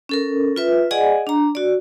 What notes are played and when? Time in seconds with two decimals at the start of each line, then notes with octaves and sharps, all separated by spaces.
0.09 C#4 A4 A#4
0.56 F4 B4 E5
0.91 G#4 D5 D#5 F#5 G#5
1.27 D4 A#5
1.55 F#4 D5